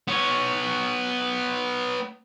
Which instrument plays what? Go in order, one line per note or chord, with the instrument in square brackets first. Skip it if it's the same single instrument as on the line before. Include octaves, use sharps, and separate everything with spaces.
[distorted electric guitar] B3 C#5